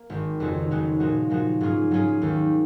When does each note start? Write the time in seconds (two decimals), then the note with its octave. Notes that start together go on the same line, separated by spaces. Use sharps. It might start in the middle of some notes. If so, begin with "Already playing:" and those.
Already playing: A#3
0.10 G#1 G#2 D#3
0.40 F2 C#3 G#3 D#4 F#4
0.71 F2 C#3 G#3 D#4 F#4
1.00 A#2 F3 G#3 D#4 F#4
1.29 A#2 F3 G#3 D#4 F#4
1.61 G#2 F#3 C#4 F4 G#4
1.91 G#2 F#3 C#4 F4 G#4
2.22 D#2 D#3 G#3